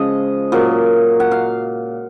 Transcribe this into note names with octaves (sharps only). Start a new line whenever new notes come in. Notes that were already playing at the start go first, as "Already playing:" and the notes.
Already playing: C#3 F3 G#3 D#5
A#2 F#3
F#5
F5